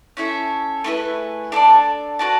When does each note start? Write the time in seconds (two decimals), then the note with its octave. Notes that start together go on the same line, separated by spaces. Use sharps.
0.17 C#4 E4 A4 E5
0.84 A3 E4 G#4 B4
1.52 D4 A4 D5
2.19 F#4 B4 D5 A5